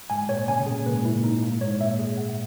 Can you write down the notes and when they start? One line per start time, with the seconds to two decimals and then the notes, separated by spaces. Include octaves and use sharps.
0.10 G#2 G#5
0.29 A#2 C#5
0.48 C#3 G#5
0.58 B2
0.66 A#2 C#3 G#4
0.86 A#2 B4
0.94 G#2
1.02 A#2 E4
1.24 D#4
1.42 A#3
1.61 G#2 C#5
1.80 A#2 E5
1.99 G#4
2.17 F#5